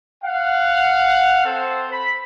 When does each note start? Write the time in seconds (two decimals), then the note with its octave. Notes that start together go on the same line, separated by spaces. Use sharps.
0.24 F5 F#5
1.45 C4 A4 C5
1.92 B5